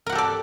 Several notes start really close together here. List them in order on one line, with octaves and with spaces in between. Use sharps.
A#4 F#5 G4 A4 D5